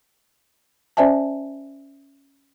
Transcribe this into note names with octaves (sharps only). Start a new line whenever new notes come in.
C#4 C5 D5 E5 G#5 A5